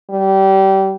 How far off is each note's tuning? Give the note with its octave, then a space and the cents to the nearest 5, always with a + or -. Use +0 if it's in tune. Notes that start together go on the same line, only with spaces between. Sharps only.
G3 -25